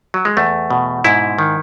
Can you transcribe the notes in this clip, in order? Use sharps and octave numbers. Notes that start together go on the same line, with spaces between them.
F#3
G#3
E2 A3
B2
G#2 E4
D#3